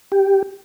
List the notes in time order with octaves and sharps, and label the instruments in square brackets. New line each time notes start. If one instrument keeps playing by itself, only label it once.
[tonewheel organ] G4